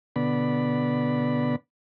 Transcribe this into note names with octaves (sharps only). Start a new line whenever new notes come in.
B2 D3 B3 D5 B5